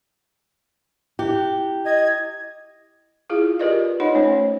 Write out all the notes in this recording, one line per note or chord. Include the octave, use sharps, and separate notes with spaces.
E4 G4
D#5 G#6
E4 F4 G#4 F5
F4 G4 A#4 B4 D5 D#5
D#4 C#5 D#5 F#5 B5
A3 C#4 C5 C#5